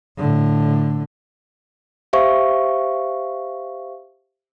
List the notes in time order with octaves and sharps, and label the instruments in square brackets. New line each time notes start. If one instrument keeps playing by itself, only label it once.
[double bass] A2 D3
[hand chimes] G4 C5 E5 F5 C#6